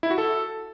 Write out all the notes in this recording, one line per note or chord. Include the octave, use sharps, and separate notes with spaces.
E4
F#4
A4